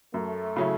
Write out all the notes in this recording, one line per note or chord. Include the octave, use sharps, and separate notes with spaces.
F#2 A3
C#3 F#3 C#4 E4